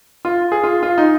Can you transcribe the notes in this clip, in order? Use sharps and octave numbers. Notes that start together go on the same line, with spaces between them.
F4
G#4
F4
F4
D#4